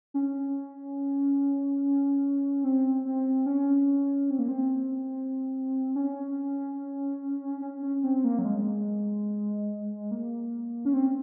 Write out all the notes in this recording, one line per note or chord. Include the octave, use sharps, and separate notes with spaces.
C#4
C4
C4
C#4
C4
A#3
C4
C#4
C#4
C#4
C4
A#3
F#3
G#3
A#3
C#4
C4